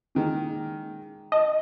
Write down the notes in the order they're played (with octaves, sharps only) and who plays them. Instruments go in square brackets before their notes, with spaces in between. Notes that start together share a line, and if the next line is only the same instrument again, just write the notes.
[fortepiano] A#2 D#3 G#3
[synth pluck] D#5 [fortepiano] A5